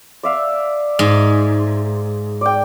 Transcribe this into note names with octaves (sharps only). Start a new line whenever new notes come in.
D5 E5 F5
G#2
D5 G5